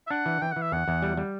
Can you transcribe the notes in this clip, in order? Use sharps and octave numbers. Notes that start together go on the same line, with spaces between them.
E5
D4 F#5
E3
E3 G5
F#5
E3
E5
E2 F#5
E2
G3
G3